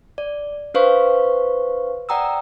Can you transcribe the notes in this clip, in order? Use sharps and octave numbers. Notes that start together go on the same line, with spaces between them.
D5
D4 B4 C5 F5 C#6
D5 F#5 G5 A#5 D#6 E6